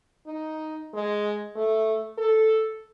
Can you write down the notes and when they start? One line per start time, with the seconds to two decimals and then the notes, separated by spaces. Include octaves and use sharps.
0.27 D#4
0.94 G#3
1.55 A3
2.18 A4